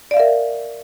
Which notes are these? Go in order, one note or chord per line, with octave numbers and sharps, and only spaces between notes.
A#4 D5 E5 F5